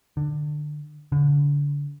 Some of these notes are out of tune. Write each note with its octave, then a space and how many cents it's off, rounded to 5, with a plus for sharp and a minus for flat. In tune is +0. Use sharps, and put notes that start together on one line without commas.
D3 +25
D3 -30